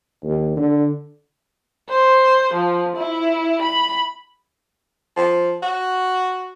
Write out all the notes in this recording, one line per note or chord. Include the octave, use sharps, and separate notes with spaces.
D#2
D3
C5
F3
E4
B5
F3
F#4